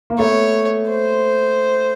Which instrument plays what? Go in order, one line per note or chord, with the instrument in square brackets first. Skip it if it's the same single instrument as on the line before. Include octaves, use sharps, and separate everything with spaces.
[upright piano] A#3
[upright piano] A3 B3 [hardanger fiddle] C#5
[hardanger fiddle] C5